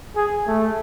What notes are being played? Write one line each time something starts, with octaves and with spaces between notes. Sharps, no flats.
G#4
A3